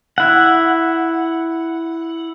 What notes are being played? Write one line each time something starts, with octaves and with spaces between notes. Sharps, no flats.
E4 F#5